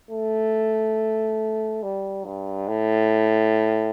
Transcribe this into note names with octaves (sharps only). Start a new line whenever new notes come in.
A3
G3
G2
A2